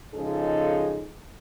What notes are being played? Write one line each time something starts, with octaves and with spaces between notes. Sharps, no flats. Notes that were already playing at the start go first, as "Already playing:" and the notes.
C#3 F3 G#3 D#4 G#4 A4